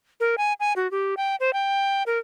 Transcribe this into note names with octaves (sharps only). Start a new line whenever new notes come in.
A#4
G#5
G#5
F#4
G4
G5
C5
G5
A#4